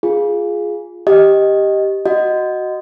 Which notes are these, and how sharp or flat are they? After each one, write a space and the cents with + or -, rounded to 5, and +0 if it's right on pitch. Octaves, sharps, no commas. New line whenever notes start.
F4 +0 G#4 +0
G4 +0 D#5 +0
F#4 +0 D#5 -5